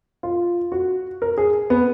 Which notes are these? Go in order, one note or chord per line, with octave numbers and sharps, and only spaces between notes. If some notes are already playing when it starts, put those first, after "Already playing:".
F4
F#4
A#4
G#4
B3